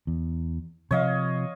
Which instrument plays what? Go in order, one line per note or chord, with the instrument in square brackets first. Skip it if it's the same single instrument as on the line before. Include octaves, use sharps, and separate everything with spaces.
[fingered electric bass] E2
[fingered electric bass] C3 F3 [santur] C#5 D#5 F5